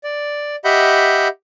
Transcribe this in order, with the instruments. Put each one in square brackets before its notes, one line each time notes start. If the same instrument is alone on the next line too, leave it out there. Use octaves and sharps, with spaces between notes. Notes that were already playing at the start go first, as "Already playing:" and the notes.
[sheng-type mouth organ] D5
G4 D#5 E5 F#5 B5 G6